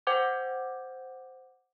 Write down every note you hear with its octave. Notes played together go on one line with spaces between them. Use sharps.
C5 F#5 G5 D6 G6 G#6